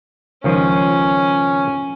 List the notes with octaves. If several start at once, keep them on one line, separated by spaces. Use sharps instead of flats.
C#2 D#3 F3 C#4